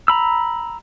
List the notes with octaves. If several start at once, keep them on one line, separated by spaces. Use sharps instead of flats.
A#5 B5 E6